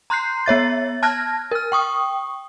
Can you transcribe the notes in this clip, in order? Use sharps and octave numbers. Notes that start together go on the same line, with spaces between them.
A#5 C6 F#6 G6 C7
B3 C#5 E5 A6
A5 F6 F#6 G#6 A#6
A#4 F6
G5 C#6 D#6